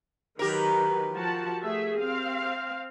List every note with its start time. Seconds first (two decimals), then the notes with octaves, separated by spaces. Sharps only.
0.39 D#3 F#3 G4 A#4 B4
1.13 F3 F#4 A5
1.62 A3 G#4 E5
2.00 C4 F5